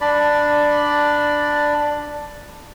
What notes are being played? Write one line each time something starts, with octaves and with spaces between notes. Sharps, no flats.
D4 D5 B5